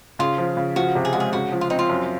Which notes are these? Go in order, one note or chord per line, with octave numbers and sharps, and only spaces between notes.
C#3 F4
F3
C#3
F3 F#4
C3
G#4
G#3 F#4
G#4
C#3 F#4
F3
F4
C4 D#4
F4
F#2